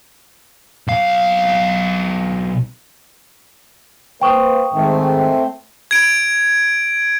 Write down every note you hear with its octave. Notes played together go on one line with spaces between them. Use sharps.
B1 F5
A#3 B4 C5 G5 C#6 D#6
G#2 D#3 A3 C4
G#6 D7